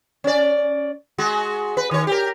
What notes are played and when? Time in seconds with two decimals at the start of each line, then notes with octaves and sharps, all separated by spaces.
0.24 C#4 D5
1.18 G#3 F#4
1.77 B4
1.91 D#3 C#5
2.07 G4 A#4